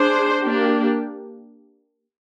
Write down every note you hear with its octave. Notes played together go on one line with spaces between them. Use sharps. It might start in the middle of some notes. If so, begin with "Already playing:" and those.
Already playing: D4 G#4 C5
A#3 D4 G4